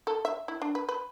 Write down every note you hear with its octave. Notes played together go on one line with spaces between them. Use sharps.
A4
E5
E4
D4
B4
B4